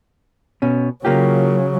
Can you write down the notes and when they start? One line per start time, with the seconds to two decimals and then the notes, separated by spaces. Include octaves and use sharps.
0.62 B2 C#4
1.05 C#3 F#3 A#3 F4 G4